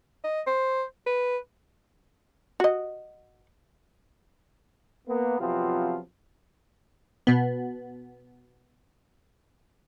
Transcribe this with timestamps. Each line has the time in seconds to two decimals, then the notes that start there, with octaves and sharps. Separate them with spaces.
0.24 D#5
0.47 C5
1.06 B4
2.60 F#4 D#5
5.08 A#3 B3
5.40 C3 F3 F#3 B3 C4 F4
7.27 B2 B3